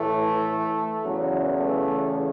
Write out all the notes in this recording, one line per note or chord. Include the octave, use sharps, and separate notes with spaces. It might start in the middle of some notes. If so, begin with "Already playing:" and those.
Already playing: A2 E3 A3
E2 C#3 E3 F#3
A3